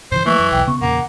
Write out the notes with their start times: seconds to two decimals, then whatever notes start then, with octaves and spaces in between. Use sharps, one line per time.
0.12 G2 C#3 E3 C5
0.26 E3 F3 A3 A#3 C#6
0.39 F#2
0.51 B1 E2 G5
0.67 C#3 B3 C#6
0.81 E2 A#2 C#3 A#3 F#5